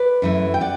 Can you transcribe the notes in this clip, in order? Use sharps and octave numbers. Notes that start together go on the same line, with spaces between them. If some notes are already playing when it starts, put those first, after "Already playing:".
Already playing: B4 D5
F#2 E3 A3
G5
D5 F#5